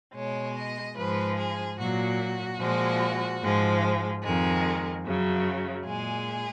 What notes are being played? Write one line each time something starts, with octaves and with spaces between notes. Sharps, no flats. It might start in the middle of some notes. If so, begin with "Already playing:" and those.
B2 G#3 C#5
D#5
G#2 F3 G#3 B4
G#4
A#2 F#3 F#4
A#2 F3 G#3
G#2 F3 G#3
F2 D#3 G#3
F#2 C#3 F#3
A#2 G#3 G#4